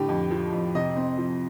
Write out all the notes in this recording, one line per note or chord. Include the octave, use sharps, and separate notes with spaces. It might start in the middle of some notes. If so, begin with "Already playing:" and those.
Already playing: A2 D3 G4
F2
F3
F2
C3 D#5
C4
F3